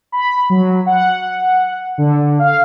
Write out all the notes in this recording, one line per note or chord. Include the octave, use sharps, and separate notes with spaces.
B5
F#3
F#5
D3
F5